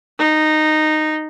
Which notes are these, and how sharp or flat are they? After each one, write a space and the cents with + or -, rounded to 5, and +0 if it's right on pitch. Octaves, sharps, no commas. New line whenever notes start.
D#4 -10